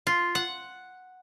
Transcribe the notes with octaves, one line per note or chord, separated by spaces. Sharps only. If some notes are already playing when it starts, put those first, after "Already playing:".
F4
F#5